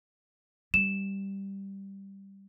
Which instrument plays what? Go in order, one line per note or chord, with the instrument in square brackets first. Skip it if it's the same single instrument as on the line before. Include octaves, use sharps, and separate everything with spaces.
[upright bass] G3 [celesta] E7